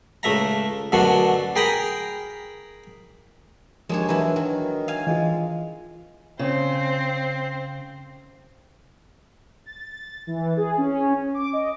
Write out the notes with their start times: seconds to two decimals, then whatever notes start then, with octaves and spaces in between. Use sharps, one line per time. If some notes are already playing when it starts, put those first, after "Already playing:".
0.23 C#2 A3 E5 A#5
0.92 F#2 B2 D3 F#3 A3 D4
1.56 G#4 A#4 G5 A#5 B5 D#6
3.89 D#2 F3 G#3 D4 C#5
4.09 E3 F#3 A#4 B4
4.36 D#3 F#3
4.88 F5 G#5
5.07 E3 G#3 F4
6.39 C#3 C4
9.66 A6
10.27 E3
10.57 G#4
10.78 C#4
11.34 D6
11.53 D#5